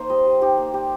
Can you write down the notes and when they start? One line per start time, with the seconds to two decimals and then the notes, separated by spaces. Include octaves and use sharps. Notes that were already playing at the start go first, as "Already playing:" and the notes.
Already playing: A#3 D#4 C5 F5
0.10 G3 D#5
0.26 G3
0.42 D#4 G4
0.57 A#3
0.74 G3 G4